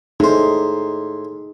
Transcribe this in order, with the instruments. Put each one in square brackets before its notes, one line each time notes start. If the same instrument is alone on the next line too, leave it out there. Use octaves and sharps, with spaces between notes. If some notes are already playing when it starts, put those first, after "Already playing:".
[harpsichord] A2 C5 [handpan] D#4 G#4